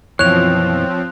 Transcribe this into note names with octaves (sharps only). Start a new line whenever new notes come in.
F#2 B2 E3 F3 C4 C#5 F#6 F7